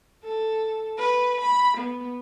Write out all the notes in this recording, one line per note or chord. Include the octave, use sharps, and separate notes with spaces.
A4
B4
B5
B3